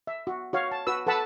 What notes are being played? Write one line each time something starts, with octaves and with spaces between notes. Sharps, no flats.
E5
F#4
F#4 C#5 F5
A5
F#4 B4 E6
A4 B4 F#5 A5 B5 E6